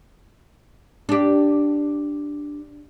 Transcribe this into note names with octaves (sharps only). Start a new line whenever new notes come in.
D4 G4